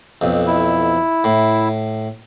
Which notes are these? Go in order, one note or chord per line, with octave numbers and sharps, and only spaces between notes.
B1 F2
E4
A2